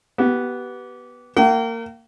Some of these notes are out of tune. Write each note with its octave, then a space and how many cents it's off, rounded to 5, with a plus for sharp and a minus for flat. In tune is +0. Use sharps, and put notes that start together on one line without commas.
B3 -10 G4 -25
A#3 -25 G5 -45